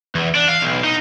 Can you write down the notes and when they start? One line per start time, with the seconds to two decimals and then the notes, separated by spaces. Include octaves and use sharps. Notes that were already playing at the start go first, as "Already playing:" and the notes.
0.15 E2
0.35 D4
0.49 F5
0.62 B1
0.84 D#4